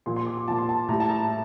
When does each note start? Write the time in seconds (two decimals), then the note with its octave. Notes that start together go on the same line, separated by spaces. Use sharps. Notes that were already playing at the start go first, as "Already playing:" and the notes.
0.06 A#2 F3 C6
0.16 C6
0.26 D6
0.37 D6
0.48 A#2 F3 A5
0.58 C6
0.69 A5
0.89 A2 G3 A#5
1.00 A5
1.09 A#5